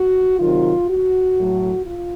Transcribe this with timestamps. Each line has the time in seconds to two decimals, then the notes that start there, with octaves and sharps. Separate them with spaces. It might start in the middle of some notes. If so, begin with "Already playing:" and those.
Already playing: F#4
0.40 C3 D#3 F#3 F4
0.89 F#4
1.37 A2 F#3
1.85 F4